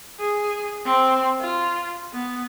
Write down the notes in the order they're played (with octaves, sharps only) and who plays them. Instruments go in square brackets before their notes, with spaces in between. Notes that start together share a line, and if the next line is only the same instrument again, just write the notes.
[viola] G#4
C4
F4
B3